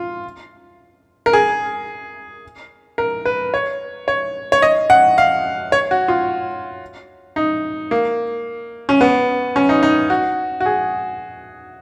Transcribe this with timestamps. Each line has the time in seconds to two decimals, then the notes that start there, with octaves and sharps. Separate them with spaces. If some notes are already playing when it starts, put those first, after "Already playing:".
Already playing: F4
1.26 A#4
1.33 G#4
2.98 A#4
3.25 B4
3.54 C#5
4.08 C#5
4.52 C#5
4.62 D#5
4.90 F#5
5.18 F5
5.72 C#5
5.91 F#4
6.08 F4
7.36 D#4
7.91 A#3
8.89 C#4
9.01 B3
9.56 C#4
9.69 D#4
9.83 D#4
10.10 F#4
10.60 F#4
10.66 G#4